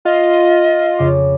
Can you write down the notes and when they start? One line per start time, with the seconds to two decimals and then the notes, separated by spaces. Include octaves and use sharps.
0.05 F4 D#5
0.98 F2 C#3 D6